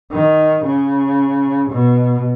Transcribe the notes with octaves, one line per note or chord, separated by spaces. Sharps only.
D#3
C#3
B2